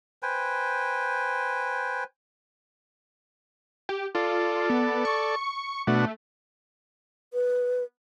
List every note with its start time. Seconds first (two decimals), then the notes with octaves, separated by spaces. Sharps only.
0.23 B4 C5 G5 G#5
3.89 G4
4.15 F4 A4 D5
4.69 B3
5.05 C#6
5.87 B2 A3 D4 F#4
7.32 B4